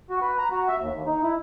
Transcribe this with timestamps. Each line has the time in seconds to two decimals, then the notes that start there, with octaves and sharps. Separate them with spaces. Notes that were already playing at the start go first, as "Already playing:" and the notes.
0.10 F#4
0.21 B4
0.38 A#5
0.51 F#4
0.68 E5
0.81 D#2
0.93 D#2
1.07 D#4
1.23 E4